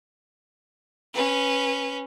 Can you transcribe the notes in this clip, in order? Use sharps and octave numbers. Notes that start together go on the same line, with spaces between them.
C#4 B4